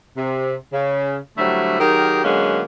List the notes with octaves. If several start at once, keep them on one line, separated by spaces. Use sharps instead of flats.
C3
C#3
D3 F#3 G3 A3 C4 E4
D#3 F#3 G4 G#4 A#4
D3 F#3 G#3 A#3 B3 C#4